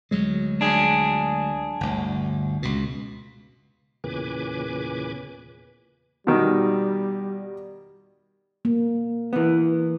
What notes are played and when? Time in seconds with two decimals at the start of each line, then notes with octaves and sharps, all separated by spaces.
0.11 D2 F#3 G#3
0.61 D4 G#4
1.81 G1 D2
2.63 C#2 B2
4.04 E2 A#2 C#3 B4 G#5 D6
6.27 B2 D#3 G3
8.65 A#3
9.33 E3 B3